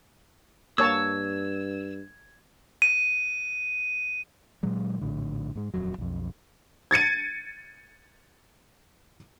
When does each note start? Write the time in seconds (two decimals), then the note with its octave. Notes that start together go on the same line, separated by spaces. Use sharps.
0.78 G2 A#3 C#5 A5 E6 G#6
2.82 D#7
4.63 A#2 D#3 F#3 G#3
5.01 A#1 A2 D3
5.55 G#2 G#3
5.74 D#1 F2 F#3
5.98 B1 F2
6.91 G#6 A6 C#7 D#7